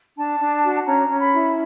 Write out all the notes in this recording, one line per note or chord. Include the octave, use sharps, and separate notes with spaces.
D4 A5
D4
F#4
C#4 A#5
C#4
B5
E4